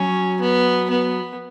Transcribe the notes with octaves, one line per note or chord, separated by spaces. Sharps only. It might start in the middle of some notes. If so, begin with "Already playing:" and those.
Already playing: F#3 C#4
B3
B3